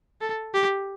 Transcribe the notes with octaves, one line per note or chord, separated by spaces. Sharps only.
A4
G4